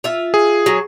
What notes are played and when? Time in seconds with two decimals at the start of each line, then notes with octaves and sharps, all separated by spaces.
0.04 F4 E5
0.34 G#4
0.66 F#3